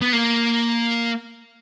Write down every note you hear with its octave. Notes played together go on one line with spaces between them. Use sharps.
B3
A#3